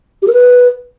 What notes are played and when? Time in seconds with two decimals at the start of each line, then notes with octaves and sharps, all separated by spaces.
0.22 G4
0.28 A#4
0.33 B4